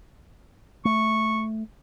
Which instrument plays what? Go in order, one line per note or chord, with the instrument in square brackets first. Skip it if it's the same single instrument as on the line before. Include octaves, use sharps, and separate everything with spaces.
[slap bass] A3 [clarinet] C#6